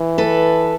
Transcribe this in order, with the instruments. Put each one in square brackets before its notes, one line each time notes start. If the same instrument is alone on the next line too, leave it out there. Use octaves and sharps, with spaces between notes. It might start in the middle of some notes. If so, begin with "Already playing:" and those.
Already playing: [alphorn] E3
[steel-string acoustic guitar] A4 B4